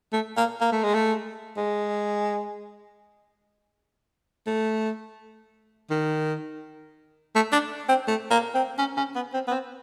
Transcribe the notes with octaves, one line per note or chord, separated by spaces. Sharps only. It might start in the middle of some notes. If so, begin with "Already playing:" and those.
A3
A#3
A#3
A3
G#3
A3
G#3
A3
D#3
A3
D4
C4
A3
A#3
C4
C#4
C#4
B3
C4
B3
C4